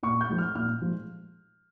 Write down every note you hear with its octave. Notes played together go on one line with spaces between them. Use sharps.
A#2 C#6
G6
F3 G#3
F6
A#2 F6
F3 G#3